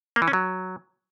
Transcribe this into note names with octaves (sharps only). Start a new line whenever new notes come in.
A#3
E3
C#4
F#3